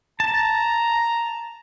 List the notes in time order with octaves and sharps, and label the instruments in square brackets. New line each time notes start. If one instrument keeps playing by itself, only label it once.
[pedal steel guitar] A5 [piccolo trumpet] A#5